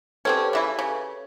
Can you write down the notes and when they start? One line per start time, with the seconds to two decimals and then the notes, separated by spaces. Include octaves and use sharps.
0.25 D3 C4 C#4 G4 A4 B4
0.53 C#3 E3 E4
0.79 C#3